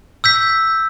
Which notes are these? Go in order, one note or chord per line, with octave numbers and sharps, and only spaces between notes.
E6 G6 B6